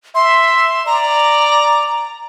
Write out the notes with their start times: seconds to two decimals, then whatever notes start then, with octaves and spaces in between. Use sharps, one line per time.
0.15 E5 C6
0.86 D5 A#5